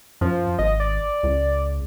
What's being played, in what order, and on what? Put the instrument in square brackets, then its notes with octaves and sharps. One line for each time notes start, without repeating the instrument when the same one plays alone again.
[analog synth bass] F#2 [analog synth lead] F3
[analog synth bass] G#1 [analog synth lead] D#5
[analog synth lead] D5
[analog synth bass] C#2